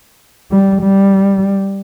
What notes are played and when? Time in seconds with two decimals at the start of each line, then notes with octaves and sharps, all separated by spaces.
0.51 G3
0.82 G3